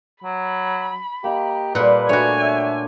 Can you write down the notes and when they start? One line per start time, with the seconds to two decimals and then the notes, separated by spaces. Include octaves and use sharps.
0.24 F#3 B5
1.24 A#3 G4 D#5
1.75 A#2 G3 A4 B4 C5 F#5
2.09 A3 D4 F#4 C#5 G#5
2.42 E5